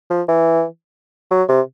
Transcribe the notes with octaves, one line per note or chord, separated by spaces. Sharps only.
F3
E3
F#3
C3